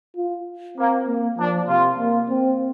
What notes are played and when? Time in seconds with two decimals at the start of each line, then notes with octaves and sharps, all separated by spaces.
0.16 F4
0.78 A#3 C4
1.07 A#3
1.38 F3 D4
1.68 C3 F4
1.99 A#3
2.29 C4